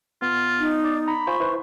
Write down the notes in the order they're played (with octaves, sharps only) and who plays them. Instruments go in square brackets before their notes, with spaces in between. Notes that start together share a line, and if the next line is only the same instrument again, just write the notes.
[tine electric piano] B3 [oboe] F4
[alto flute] D#4
[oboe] D5
[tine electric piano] A#5 [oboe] B5
[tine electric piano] F4 C5 G#5 [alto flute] C#6
[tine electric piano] E4 B4 C5